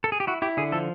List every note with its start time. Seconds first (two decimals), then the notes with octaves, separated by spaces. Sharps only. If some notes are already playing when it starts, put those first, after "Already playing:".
0.04 A4
0.12 G#4
0.20 G4
0.27 E4 F#4
0.42 E4 G4
0.57 D3 G#4
0.72 F3 A4